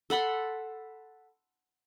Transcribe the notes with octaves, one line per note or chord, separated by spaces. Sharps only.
A4 F#5 B5 C6